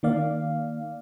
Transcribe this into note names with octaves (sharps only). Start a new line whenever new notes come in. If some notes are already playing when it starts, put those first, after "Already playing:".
D#3 A#3 D5 F5